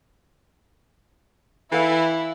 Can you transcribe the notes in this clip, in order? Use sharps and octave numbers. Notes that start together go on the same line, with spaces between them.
E3 E4 A4 F5